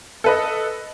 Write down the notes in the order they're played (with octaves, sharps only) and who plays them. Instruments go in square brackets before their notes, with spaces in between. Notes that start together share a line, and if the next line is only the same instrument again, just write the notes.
[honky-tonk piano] A4 B4 D#5